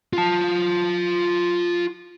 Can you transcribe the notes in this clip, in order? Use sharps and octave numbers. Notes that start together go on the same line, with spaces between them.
F4 A5